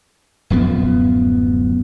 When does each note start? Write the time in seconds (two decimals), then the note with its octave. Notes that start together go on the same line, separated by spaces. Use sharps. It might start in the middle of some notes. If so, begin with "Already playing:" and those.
0.50 D1 F#2 F3 B3